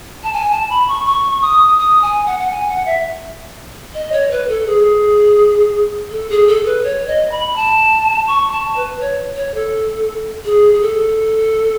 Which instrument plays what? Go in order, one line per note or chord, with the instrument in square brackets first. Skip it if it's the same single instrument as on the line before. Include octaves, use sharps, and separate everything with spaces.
[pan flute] A5
G#5
A5
B5
C#6
C#6
D#6
D#6
G#5
F#5
F#5
G#5
F#5
E5
D#5
C#5
B4
A4
G#4
A4
G#4
A4
B4
C#5
D#5
B5
A5
C#6
A5
B4
C#5
C#5
A4
G#4
G#4
A4